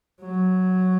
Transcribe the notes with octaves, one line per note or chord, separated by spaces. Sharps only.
F#3